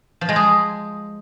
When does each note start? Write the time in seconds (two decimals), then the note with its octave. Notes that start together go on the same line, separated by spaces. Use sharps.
0.21 F3
0.29 G#3
0.36 G#4